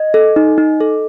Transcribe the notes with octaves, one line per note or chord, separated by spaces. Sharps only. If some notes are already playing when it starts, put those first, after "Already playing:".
Already playing: D#5
A4
D#4
D#4
A4